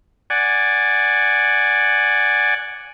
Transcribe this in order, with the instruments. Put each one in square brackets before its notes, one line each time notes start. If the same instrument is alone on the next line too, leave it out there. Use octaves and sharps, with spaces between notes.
[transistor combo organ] D5 F#5 G#5